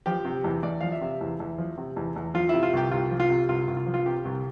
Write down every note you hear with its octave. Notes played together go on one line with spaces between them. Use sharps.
F3 G4
C3
E2
E2 D5
F3 F5
E5
C3
E2
E2
F3
C3
E2
E2
F3 F4
C3 E4
F4
C2 G4
C2 F4
F3
F4
C3
C2 F4
C2
F4
F3
F4
C3 G4
C2